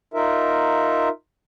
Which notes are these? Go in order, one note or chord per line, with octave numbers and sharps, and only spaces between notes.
D#4 F4 A#4 E5